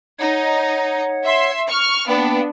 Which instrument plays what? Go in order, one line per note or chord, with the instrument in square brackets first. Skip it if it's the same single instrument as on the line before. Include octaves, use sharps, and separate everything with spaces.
[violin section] D#4 [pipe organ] C#5 F#5
[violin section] E5 C6
C#6 F6
[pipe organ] A#3 G5 [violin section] B3 D4